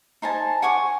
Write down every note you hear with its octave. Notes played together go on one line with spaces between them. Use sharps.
D#4 C5 G#5 A5
F#5 G#5 C#6 D6